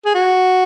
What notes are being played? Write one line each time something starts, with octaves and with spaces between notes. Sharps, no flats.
G#4
F#4